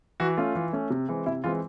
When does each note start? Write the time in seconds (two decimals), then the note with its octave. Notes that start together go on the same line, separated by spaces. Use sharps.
0.20 E3 F#4
0.37 A3 C#4 F4
0.55 E3
0.73 A3 C#4
0.90 C3
1.09 E3 G#3 C4
1.26 C3 E4
1.44 E3 G#3 C4 F4